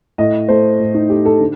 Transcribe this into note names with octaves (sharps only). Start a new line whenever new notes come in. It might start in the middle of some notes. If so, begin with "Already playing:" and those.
A2 D#5
A3 C5
A2
D#4
A3 G4
A4
D3